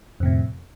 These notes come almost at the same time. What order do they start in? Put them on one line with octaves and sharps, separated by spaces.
F2 C3 A2